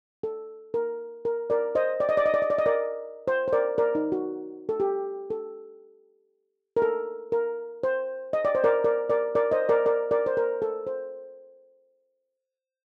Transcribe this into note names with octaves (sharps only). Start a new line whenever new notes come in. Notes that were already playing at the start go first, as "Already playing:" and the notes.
A4
A#4
A#4
A#4 D5
C5 D#5
D5
D#5
D5
D#5
D5
D#5
D5
D#5
A#4 D5
C5
C5
A#4 D5
A#4 D5
D#4
F#4
A4
G4
A4
A#4
A4
A#4
C5
D#5
D5
C5
A#4 D5
A#4 D5
A#4 D5
A#4 D5
C5 D#5
A#4 D5
A#4 D5
A#4 D5
C5
A#4
A4
C5